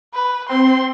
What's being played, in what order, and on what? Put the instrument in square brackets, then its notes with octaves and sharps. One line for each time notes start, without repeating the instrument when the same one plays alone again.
[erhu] B4
[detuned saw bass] C4 [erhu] C6